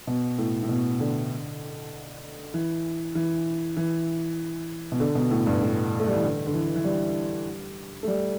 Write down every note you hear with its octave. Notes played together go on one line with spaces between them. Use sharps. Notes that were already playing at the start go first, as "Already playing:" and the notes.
B2
A2
A2
B2
D3
E3
E3
E3
B2
D3
B2
A2
G2
A2
A3
G3
E3
D3
D3
E3
E3
G3
A3
G3